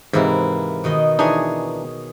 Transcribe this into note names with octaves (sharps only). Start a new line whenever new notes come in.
G#2 C3 E3 A#3 E4
B2 D#3 D#5
E3 D4 D#4 G#4 C#5 G#5